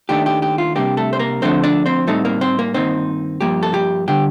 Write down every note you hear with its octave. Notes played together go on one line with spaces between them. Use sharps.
D#2 D#3 A3 D4 G4
G4
G4
F4
C2 C3 G3 A#3 D4 G4
A3 A4
C5
A#3 A#4
D2 D3 F3 A3 C4 D4 C5
D4 D5
C4 C5
A2 G3 A3 C4 D#4 A4
A#3 A#4
C4 C5
A#3 A#4
G2 D#3 A#3 C4 D#4 C5
G2 F3 A#3 G4
A4
G4
D3 G3 G4